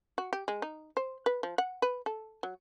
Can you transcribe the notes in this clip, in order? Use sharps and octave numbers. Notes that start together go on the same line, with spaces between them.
F#4
G4
G#3
D#4
C5
B4
F3
F#5
B4
A4
F#3